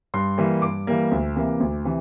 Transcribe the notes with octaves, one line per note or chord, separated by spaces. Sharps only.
G2 C6
E3 G3 A#3
G2 D6
E3 G3 A#3
D2
C3 E3 A#3
D2
C3 E3